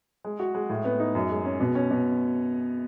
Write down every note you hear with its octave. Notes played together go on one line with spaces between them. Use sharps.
G#3
F#4
G#3
A2
B3
D#4
F#2
G#3
C#4
B2
C#4
B2